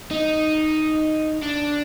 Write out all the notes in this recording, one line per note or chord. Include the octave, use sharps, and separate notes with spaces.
D#4
D4